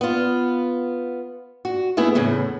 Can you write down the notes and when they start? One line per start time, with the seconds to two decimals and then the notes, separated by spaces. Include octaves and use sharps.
0.01 B3 F4
1.65 F#4
1.97 A3 B3 E4 G#4
2.15 E2 A2 C#3